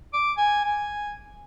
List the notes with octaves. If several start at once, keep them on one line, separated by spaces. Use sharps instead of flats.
D6
G#5
G#5